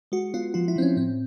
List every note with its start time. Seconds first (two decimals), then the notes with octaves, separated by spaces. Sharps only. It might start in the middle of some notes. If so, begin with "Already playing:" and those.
0.12 G#3 F#4
0.34 B3 F4
0.54 F3 F4
0.68 E4
0.76 F3 C4
0.82 C#4
0.97 A2 C4